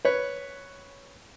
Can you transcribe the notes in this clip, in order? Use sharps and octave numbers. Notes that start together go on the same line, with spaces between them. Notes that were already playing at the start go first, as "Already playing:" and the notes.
B4 C#5